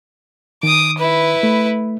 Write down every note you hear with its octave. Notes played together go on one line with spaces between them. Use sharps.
D#3 D6 D#6
E4 B4
A3